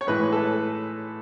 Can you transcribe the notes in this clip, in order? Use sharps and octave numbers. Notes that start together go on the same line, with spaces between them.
C#5
A2 E3 G#3 B4
A4